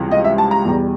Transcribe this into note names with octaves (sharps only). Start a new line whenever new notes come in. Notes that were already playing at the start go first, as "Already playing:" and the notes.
Already playing: C#2 C3 E3 G3
D#5
E5
A5
A#5
E2 B2 G3